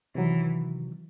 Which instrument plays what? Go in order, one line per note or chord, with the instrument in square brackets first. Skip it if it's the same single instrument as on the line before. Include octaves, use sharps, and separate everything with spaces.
[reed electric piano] C3 D#3 F#3 [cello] E3